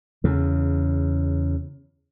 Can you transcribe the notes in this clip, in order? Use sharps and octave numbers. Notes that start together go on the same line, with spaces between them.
E2 C#3